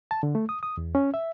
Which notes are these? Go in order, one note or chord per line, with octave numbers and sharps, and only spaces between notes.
A5
D3
A3
D#6
D#6
E2
C#4
E5